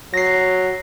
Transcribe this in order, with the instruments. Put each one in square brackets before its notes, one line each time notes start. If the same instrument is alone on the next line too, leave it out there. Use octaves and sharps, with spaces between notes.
[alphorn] F#3 [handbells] A#6 C7